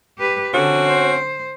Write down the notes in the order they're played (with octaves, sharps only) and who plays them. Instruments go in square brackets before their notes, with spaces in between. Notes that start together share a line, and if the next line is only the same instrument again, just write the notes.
[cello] G4 B4
[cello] D3 [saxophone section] C4 C#4 F#4
[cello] C5